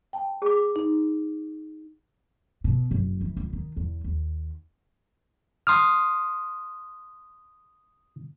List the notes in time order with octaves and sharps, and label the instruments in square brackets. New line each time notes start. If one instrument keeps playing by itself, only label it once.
[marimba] G5 A5
[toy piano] G#4 D6
[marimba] D#4
[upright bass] B2
F#1
E3
C#2
D#3
E2
D#2
[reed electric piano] C6 D#6 F6